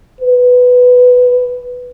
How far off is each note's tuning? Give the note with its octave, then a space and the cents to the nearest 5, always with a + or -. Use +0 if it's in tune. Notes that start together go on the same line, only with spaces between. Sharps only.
B4 +5